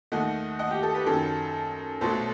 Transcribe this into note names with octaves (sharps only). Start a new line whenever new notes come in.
D#2 D#3 A3 D#5 F#5
D#5 F#5
G4
A4
G4 B4
F#2 D#3 F#3 A4
B1 B2 F#3 A3 A4 C5